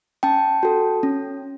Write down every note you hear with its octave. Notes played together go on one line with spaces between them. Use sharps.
C#4 G5 A5
F#4 A4
C#4